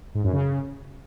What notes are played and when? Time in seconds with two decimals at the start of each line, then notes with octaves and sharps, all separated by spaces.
0.15 G#2
0.24 F#2
0.33 C#3